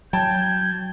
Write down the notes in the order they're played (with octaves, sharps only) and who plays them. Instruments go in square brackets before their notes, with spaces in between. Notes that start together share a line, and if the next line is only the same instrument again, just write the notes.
[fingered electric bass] F#3 [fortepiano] G5 A5 [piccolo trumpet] G6 [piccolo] G#6